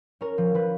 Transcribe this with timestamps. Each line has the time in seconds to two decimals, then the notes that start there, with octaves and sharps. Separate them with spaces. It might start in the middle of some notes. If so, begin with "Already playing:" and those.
0.21 C#4 A#4
0.38 F3
0.54 F3 B4